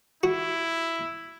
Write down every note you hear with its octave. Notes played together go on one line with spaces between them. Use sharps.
E4 F#4